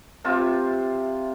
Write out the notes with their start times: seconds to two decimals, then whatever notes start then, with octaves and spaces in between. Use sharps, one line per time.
0.24 C3 F4 E5